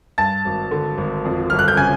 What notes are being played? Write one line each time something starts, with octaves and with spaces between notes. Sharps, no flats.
G2 A5 A6
G#1
D3
G#1
F2
G1 F6
F#6
G6
C#3 G#5 G#6